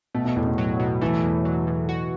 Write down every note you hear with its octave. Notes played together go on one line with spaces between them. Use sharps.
B2 A3
B2
E2 A2
B2
F#3
B2
E3 A3
E2
F#3
B2
F#4